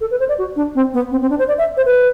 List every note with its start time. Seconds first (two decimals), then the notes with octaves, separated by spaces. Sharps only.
0.01 A4
0.11 B4
0.20 C5
0.29 D5
0.38 F#4
0.56 D4
0.75 C4
0.94 B3
1.11 C4
1.22 C4
1.30 D4
1.39 C5
1.48 D5
1.58 E5
1.77 C5
1.86 B4